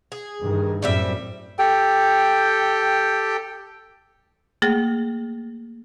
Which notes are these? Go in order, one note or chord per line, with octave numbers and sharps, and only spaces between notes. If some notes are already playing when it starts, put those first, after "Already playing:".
G#4
G2 D#3
F#2 A2 G3 C4 E5
G4 A4 G5
A3 A#3 G#4